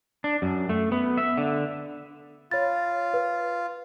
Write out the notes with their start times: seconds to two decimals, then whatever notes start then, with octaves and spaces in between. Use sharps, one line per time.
0.24 D4
0.42 F#2
0.69 A3
0.92 B3
1.17 E5
1.38 D3
2.51 F4 C#5 B5 A6
3.14 B4